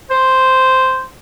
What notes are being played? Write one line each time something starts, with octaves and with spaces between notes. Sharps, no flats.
C5